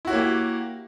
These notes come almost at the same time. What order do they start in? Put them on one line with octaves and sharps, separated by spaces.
E4 F#4 C#5 A#3 G4